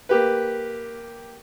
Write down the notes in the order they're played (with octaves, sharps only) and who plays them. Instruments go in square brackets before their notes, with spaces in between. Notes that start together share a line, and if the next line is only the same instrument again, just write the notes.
[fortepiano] A#3 G4 B4